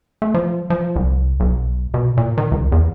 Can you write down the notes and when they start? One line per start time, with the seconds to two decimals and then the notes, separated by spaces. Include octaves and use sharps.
0.22 A3
0.34 F3
0.70 F3
0.96 C2
1.40 B1
1.94 B2
2.17 A#2
2.38 D#3
2.52 C#2
2.72 E2